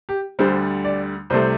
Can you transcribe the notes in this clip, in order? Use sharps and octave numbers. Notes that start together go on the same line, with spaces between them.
G4
D2 D3 G3 C5
D5
C2 C3 A3 C5